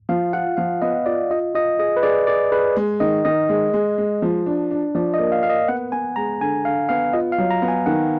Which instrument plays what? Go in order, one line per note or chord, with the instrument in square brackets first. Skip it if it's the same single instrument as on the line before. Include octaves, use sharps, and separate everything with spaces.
[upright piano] F3 [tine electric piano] F5
[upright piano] F4 [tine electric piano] F#5
[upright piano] F3 [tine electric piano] F5
[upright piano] B3 [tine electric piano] D#5
[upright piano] F4 [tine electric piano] D5
[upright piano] F4 [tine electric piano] D#5
[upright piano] F4 [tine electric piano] D#5
[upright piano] G#4 [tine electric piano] D#5
[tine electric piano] B4
[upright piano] G#4 [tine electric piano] D5
[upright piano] G#4 [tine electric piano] D5
[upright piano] G#4 [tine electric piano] B4
[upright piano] G#3
[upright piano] D#3 [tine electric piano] D#5
[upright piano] D#3 [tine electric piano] D#5
[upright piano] G#3
G#3
G#3
F3
D4
D4
[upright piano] F3 [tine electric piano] D5
[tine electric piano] D#5
[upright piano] A#3
[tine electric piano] F5
[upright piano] A#3 [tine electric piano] F5
[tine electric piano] D#5
[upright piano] B3 [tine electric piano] F#5
[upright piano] B3 [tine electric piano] G#5
[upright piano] G#3 [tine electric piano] A#5
[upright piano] D3 [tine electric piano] G#5
[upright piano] D3 [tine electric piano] F5
[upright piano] B3 [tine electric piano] F5
[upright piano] F4 [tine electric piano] D#5
[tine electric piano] F5
[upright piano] F#3
[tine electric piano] A#5
[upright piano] B3
[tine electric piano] G#5
[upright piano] D#3 [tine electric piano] F#5